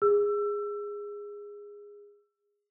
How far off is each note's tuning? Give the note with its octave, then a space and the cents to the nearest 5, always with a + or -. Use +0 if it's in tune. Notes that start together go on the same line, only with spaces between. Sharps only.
G#4 -15 E6 +25